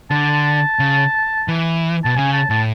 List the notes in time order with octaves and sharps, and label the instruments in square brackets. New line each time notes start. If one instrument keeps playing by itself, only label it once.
[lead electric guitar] D3 [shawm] A5
[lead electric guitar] C#3
E3
[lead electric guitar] B2 [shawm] A5
[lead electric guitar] C#3 [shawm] G#5
[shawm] A5
[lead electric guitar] A2 [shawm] A5